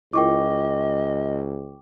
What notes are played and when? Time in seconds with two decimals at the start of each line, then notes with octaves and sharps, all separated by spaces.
0.13 C#2 E4 F4 A#4 D#5 G5 C#6 D6